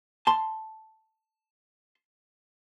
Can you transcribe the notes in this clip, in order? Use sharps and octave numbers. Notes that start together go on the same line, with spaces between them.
A5 C6